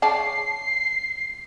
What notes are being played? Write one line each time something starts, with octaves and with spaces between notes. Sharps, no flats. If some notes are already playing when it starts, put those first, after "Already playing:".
C#3 D5 A5 C7